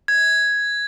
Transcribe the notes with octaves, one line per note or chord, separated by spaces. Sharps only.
G#6